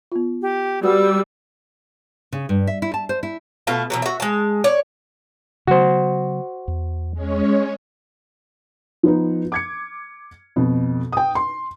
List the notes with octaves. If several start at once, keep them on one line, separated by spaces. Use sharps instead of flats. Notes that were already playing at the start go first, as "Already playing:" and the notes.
B3 F4
G4
G3 F#4 B4 F#5 E6
C#3
G2
E5
E4
A5
C5
E4
B2 A3 F4 A5
B2 E3 F#3
F#4 E5
G#3 A5
C#5 D5
C#3 F#3 B3 F#4 C5
E2
G#3 C#4 C#5
F3 B3 D#4
D6 G#6 C#7
F2 B2
G5 D#6
C6